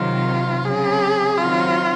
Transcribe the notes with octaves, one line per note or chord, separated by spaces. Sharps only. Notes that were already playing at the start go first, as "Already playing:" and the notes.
Already playing: C3 D#3 F#3 F4
C#3 F#3 C4 G#4
D#3 F#3 C4 F4 F#4